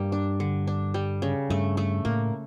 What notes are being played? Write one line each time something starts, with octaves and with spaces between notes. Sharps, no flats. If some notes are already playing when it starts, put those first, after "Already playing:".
Already playing: G2 G3 A#3
D4
D3
D4
G3
C#3
G2 A3
A3
A2 A#3